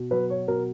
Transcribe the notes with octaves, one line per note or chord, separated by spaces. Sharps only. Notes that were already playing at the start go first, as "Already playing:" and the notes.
Already playing: B2
F#3 B4
C#5
B2 A#4